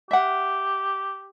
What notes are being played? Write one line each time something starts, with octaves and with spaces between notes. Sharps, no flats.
G4 E5 F#5